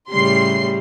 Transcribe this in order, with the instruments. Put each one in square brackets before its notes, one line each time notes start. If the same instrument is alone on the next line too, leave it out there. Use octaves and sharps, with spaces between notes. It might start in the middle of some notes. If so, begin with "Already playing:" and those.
[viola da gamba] A2 C#3 G3 [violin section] C6 C7